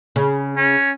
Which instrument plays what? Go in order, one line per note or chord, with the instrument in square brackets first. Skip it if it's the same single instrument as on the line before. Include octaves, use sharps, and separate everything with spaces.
[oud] C#3
[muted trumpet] C#4